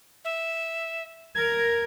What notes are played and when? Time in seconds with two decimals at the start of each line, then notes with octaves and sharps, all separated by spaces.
0.25 E5
1.35 A#4 G#6